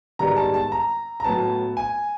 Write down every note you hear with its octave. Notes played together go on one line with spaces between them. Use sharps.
G#2 D#3 G3 B3 A#5
A5
A5
A#5
A#5
A2 F#3 B3 A5
G#5